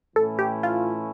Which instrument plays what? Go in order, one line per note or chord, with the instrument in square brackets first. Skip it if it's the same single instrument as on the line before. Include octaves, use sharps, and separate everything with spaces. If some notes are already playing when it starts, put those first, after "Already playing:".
[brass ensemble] A2 E3 A3 C#4 E4 [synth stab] A4
[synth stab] G4
F4